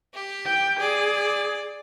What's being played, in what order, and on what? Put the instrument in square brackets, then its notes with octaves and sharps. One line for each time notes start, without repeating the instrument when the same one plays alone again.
[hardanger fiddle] G4
[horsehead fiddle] G5
[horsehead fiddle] G#4 [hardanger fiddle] D5